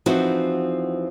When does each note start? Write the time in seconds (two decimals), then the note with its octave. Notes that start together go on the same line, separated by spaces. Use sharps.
0.06 E2 F3 C4 D#4 E4 F#4